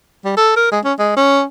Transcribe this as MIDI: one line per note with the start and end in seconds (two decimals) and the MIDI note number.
0.25 0.33 55
0.37 0.53 69
0.56 0.69 70
0.72 0.79 56
0.84 0.93 61
0.99 1.12 56
1.16 1.43 61